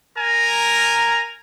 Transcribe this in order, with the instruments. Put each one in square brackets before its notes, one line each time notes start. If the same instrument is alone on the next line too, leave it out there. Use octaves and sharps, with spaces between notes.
[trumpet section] A#4 G#5 A#5